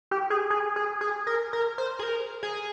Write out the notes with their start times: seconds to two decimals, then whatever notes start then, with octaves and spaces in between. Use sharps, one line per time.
0.11 G4
0.30 G#4
0.50 G#4
0.76 G#4
1.01 G#4
1.27 A#4
1.53 A#4
1.78 C5
1.99 G#4
2.03 A#4
2.43 G#4